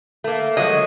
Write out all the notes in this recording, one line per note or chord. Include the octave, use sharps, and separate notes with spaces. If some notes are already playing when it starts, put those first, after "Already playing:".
A3 A#3
F3 F#3 G#3 D#5